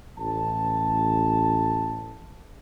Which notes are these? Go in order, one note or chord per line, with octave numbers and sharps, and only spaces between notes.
A1 A5